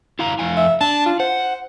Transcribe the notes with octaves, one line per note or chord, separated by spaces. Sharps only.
E4 F5 A#5
F2 F5 G#5
E5
D4 A5
F4
C5 F#5